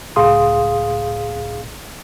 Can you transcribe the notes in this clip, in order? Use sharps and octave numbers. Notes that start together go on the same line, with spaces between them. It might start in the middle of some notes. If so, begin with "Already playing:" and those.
C#2 A2 G#4 F5 C6 D#6